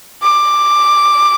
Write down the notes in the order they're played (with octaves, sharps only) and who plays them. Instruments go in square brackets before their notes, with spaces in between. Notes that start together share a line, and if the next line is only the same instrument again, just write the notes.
[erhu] D6